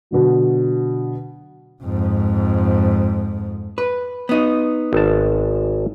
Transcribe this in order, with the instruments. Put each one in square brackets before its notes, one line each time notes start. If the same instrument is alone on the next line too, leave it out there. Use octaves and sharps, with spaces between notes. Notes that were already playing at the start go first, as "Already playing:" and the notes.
[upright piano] B2 D3 F#3
[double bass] F2 G#2
[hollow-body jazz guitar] B4
B3 D#4
[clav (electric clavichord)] G#1 A5